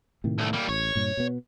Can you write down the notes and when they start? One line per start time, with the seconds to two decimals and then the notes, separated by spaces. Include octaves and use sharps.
0.24 A2 C3 D#3
0.38 C2 A3
0.53 G3 A#3
0.69 A1 C#5
0.95 G2 A#2
1.17 B2 B3